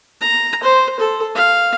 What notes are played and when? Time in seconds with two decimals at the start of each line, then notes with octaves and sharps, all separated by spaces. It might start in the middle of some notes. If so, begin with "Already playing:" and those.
0.21 A#5
0.63 C5
0.99 A4
1.35 F5